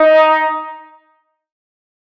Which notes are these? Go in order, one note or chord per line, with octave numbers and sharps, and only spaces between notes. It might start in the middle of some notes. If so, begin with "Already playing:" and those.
Already playing: D#4